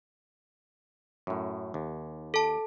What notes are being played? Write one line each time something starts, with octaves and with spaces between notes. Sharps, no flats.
F#2 A2
D#2
A4 A5